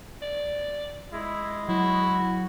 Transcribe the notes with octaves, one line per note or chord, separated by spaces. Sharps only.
D5
G#3 E4
F#3 E4 F#4